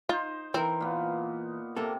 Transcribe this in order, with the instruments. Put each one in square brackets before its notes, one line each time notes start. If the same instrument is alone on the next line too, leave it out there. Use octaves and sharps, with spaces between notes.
[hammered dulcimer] D#4 C5 [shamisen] F4
[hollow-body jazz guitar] E3 A#4 [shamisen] C4
[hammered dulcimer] A#2 B3
[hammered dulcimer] C3 [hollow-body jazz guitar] A#3 A4